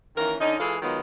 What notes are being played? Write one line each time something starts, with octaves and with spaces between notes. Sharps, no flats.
D#3 E3 A#3 C#4 A#4
D3 C#4 D#4
E3 G#3 F4 G#4 A4
D#3 F#3 G#3 B3 F4